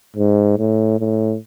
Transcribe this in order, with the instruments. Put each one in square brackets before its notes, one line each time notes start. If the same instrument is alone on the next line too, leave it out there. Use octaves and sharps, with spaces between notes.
[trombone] G#2
A2
A2